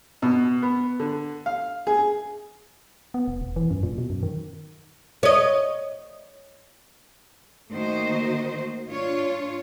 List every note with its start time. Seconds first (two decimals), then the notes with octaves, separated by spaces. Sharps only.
0.22 B2
0.62 B3
1.00 D3
1.46 F5
1.87 G#4
3.14 B3
3.28 E1
3.42 E1
3.56 E3
3.71 F#2
3.83 A#2
3.98 B2
4.10 F#2
4.23 D#3
5.23 C#5 D#5
7.71 D#3 A3 A#3 F#4 C5 D#5
8.90 D4 F4 C#5